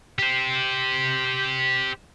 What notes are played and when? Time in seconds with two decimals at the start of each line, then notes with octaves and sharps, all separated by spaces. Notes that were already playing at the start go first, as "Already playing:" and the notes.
0.19 G4 C5